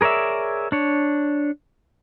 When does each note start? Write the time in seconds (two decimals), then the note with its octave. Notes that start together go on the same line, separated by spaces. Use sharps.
0.01 G#4 A#4 C#5 D5 E5
0.72 D4 C#5